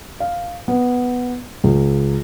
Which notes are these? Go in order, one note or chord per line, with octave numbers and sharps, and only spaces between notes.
F5
B3
C#2